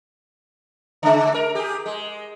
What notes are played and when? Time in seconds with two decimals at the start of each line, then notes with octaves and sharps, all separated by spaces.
1.03 C#3 G#3
1.34 A#4
1.55 G4 G#4
1.86 G#3